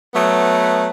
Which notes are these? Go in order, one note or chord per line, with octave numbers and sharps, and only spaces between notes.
F#3 A3 B3